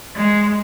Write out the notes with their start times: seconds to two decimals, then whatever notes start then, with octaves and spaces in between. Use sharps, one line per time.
0.15 G#3